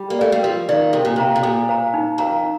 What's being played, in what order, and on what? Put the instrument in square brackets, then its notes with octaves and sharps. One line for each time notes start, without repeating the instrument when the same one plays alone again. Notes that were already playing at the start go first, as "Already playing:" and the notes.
Already playing: [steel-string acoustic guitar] G3
A#3
[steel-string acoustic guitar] A3 [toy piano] D5 F5
[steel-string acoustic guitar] G3
[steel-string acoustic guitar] F3 [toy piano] A#4
[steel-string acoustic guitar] D#3 [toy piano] D5 F5
[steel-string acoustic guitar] C3 [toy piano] A4
[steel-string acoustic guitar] A#2
[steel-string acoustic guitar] C3 [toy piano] C5 F5 A#5
[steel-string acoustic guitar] C3
[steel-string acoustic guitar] A#2 [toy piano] A4
[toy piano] C5 F5 A#5
D#4
[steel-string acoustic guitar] F2 [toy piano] A#4 F5 A#5
[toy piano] D#4